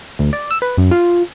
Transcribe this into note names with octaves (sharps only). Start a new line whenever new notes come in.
D2
D5
E6
B4
F#2
F4